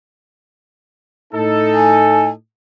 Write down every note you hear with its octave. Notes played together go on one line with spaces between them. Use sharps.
A2 D#4 A4
G#5